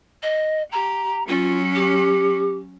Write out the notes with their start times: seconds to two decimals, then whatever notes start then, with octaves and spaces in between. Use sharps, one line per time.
0.22 D#5
0.72 G4 A#5
1.28 F#3 C#4 F4
1.75 G4